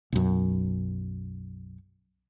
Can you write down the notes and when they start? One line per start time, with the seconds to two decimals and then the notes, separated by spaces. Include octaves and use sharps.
0.12 B1 F#2